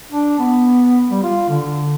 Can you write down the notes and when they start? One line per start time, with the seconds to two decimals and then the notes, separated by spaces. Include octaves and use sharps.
0.12 D4
0.39 B3
1.11 G3
1.23 F4
1.49 D3